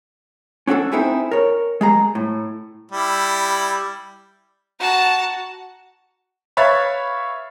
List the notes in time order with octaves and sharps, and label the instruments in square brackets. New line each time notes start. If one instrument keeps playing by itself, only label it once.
[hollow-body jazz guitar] C#4 D4 F#4 G4 A4
C4 D#4 E4 G#4 B4 C5
A#4 C#5
G#3 G#4 A#5
A2
[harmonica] G3 E4
[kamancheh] F#4 [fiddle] A5 A#5
[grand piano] B4 C#5 E5 F5 B5 A6